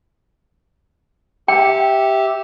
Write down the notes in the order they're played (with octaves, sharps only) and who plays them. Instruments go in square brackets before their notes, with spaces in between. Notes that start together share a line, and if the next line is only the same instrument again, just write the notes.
[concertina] G4 E5 [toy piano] G5